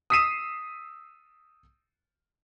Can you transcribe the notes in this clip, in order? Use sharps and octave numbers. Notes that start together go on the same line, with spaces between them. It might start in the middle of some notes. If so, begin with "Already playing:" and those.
D#6 E6 B6 C7 D#7 E7